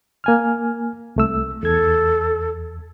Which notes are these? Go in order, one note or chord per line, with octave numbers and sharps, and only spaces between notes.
A#3 G#5 F6
C2 A3 E6
E2 A4 G#6